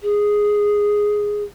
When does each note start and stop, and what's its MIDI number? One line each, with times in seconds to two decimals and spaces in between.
0.01 1.43 68